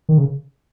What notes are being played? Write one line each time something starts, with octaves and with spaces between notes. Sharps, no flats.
D#3
C#3